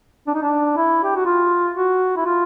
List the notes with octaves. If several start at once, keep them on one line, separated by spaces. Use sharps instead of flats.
D4
D#4
D4
E4
G4
F#4
F4
F#4
E4
F4